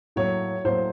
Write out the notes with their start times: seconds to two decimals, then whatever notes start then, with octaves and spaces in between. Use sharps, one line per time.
0.16 A2 F#3 A#3 C#5
0.65 A2 F#3 A#3 C5